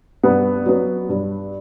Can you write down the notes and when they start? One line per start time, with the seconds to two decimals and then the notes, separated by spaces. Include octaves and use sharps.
0.23 G2 B3
0.66 F#3 B3
1.09 G2